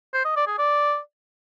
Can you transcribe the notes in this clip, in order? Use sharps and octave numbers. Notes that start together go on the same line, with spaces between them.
C5
D#5
D5
G#4
D5